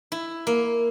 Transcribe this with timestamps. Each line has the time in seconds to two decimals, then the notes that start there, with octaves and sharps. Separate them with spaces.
0.12 E4
0.47 A#3